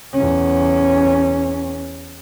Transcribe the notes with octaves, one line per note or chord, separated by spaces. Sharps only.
E2 C#4